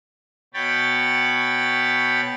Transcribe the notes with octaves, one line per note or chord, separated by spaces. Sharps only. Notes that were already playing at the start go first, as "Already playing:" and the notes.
B2 C#5 G5 B5 A6